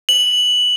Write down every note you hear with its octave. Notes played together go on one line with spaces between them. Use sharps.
F#7